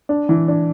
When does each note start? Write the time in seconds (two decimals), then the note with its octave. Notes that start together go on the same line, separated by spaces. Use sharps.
0.09 D4
0.29 E3
0.48 D4